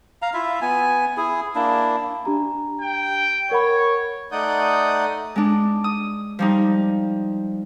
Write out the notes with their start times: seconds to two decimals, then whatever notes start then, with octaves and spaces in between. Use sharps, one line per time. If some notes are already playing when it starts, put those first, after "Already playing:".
0.22 F5 A#5
0.34 E4 F4 E5
0.62 B3 G#5
1.17 E4 G#4
1.55 A#3 D4 E4
2.25 D4 G4 A#5
2.81 G5
3.51 A#4 C#5 F#5 B5
4.32 A3 D#4 D5 F#5 D#6 G6
5.36 G#3 D4
5.84 D#6
6.39 F3 G3 D#4